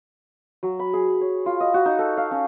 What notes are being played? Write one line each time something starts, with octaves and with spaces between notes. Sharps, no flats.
F#3
B5
G#4
C#5
F4
D#5
F#4
D#4
A4
F5
C#4